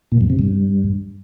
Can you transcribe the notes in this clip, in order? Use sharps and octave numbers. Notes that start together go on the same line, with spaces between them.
A#2
F#2
C3
G2